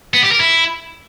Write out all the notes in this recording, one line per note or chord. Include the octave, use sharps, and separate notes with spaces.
B3
G4
A#4
E4